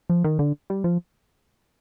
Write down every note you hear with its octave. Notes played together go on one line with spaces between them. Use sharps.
F3
D#3
D3
G3
F3